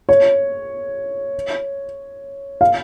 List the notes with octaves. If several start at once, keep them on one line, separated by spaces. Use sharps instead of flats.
C#5
F5